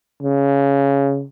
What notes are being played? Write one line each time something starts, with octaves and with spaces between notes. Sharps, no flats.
C#3